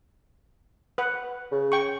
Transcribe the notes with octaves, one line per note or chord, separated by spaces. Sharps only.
B4 F#5
C#3
G5 C#6